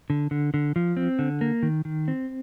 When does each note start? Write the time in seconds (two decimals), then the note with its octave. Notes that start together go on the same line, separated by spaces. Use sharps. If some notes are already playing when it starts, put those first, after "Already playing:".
0.10 D3
0.31 D3
0.54 D3
0.76 F3
0.97 C4
1.19 D3
1.41 A#3
1.63 D#3
1.85 D#3
2.08 C4